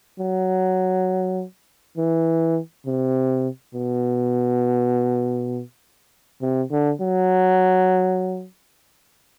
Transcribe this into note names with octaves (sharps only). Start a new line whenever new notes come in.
F#3
E3
C3
B2
C3
D3
F#3